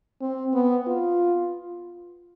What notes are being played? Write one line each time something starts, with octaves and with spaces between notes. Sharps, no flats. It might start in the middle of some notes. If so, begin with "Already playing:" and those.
C4
B3
F4